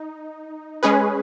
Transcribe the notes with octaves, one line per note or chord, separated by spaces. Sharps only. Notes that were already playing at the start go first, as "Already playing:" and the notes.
Already playing: D#4
G#3 C#4 G#4 B4